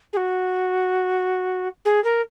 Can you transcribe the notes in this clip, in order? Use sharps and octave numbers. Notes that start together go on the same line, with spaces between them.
G#4
F#4
G#4
A#4